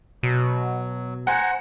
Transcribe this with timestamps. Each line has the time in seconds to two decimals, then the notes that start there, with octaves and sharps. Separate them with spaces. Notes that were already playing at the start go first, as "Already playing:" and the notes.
0.23 B2 F#3
1.27 C5 F#5 G#5 A#5